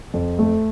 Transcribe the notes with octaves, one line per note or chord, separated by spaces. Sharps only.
F2
A3